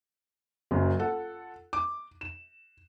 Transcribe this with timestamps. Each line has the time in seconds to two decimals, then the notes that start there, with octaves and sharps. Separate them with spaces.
0.71 F#1 F#2
0.99 F4 A4 F#5
1.73 D6
2.21 E7